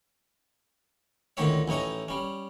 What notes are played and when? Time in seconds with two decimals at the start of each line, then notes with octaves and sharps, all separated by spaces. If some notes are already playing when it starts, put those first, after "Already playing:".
1.37 C#2 A2 D3 D#3 C#5 E5
1.68 A1 A2 D#4 C#5 G#5
2.08 G3 C#4